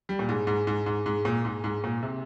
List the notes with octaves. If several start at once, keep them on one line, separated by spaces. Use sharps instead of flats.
G3
A#2
G#2
G#2
G#2
G#2
G#2
A#2
G#2
G#2
A#2
C3